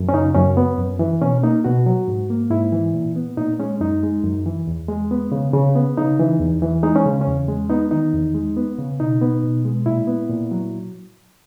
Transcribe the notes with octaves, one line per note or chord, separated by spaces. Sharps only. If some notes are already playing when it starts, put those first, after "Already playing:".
Already playing: F#2
C#4
C#3 D#4
F#2 C#4
B3
F#2
E3
B2 C#4
A#3 D#4
B2 F#4
F#3
G#2
A#3
G#2 E4
E3
A#2
B3
A#2 D#4
G#3 C#4
F#2 D#4
G#3
F#2
E3
E2
G#3
B3
C#3
C#3
B3
C#3 D#4
E3
E2
E3
G#3 D#4
C#4
C#3
C#4
E2
G#3
B3 D#4
D#3 D#4
E2
G#3
B3
C#3
B2 D#4
B3
B2
G#3
A#2 E4
B3
A#2
F#3